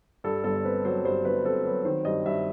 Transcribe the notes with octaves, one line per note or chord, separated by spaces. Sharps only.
G2 A4
G1 A4
C4 B4
F#3 C5
G2 C5
G1 B4
C4 A4
F#3 B4
D#3 C5
G2 D#5
G2 E5